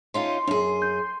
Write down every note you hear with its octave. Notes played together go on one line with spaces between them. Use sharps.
C#4 D#4 F4 C6
F#2 D4 G#4
G6